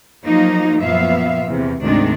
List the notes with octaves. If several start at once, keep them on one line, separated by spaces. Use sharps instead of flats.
F3 F#3 A#3 D#4
F#2 A#2 F3 B3 E5 F5
E2 C3
D2 G#2 C3 D#3 G#3 D4